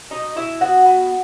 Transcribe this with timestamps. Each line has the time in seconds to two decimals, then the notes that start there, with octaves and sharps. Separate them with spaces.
0.10 B2 D#4 D#5
0.36 B2 E4 E5
0.61 B3 F#4 F#5
0.86 B3